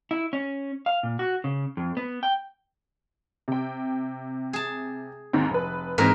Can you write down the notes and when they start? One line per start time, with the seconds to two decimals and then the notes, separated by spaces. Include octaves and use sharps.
0.11 E4
0.33 C#4
0.86 F5
1.03 A#2
1.19 F#4
1.44 C#3
1.77 F2
1.97 B3
2.23 G5
3.48 C3 G5
4.53 G#4 A5
5.33 D#2 G#2 C4
5.51 F1 B4
5.98 G#2 E3 A#3 C4 A#4